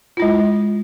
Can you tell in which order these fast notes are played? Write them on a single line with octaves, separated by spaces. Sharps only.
F4 E4 G#3